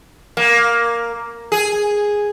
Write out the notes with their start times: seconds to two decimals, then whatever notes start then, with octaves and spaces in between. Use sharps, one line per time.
0.37 A#3
1.52 G#4